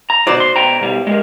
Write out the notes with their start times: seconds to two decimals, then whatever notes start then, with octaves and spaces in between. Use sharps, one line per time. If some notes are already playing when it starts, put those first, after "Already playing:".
0.10 A#5
0.27 F#2 B2 F#4 C5 D5
0.40 C6
0.56 B1 G5 A#5
0.81 B2 G3
1.07 G#3 G4 A#4